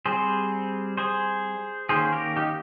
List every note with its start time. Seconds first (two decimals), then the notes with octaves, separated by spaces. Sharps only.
0.06 G3 C4 G#4 C5
0.97 G#4 C5
1.89 D#3 A#3 C#4 G#4 C5
2.12 G4 A#4
2.36 D#4 G4